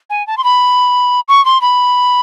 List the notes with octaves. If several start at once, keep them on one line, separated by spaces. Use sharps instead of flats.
G#5
A5
C6
B5
C#6
C6
B5